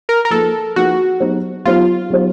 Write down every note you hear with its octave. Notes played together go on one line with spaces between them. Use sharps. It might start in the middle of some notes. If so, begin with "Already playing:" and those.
A#4
A#4
F3 A#3 D#4 G#4 A4 B4
F3 A#3 D#4 F#4 G#4 B4
F#3 B3 D#4 G4 C5
F#3 B3 D#4 F4 G4 C5
F#3 B3 D#4 G4 C5